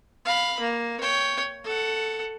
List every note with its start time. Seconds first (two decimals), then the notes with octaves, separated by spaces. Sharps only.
0.25 F5 B5
0.60 A#3
1.00 C#5 G5
1.64 A4 F#5